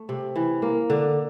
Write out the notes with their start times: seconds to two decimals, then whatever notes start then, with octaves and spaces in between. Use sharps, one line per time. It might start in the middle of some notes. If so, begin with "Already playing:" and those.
Already playing: A3
0.09 C3
0.36 E3
0.62 A#3
0.90 D3